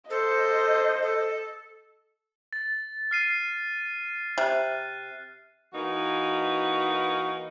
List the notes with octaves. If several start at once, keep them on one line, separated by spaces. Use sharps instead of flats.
A4 C5 D#5
A4
A6
F6 C7 D#7
C3 F6 F#6
E3 A#3 D#4 F#4